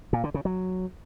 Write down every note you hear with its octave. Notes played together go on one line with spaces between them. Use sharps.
A#2
D3
C#3
F#3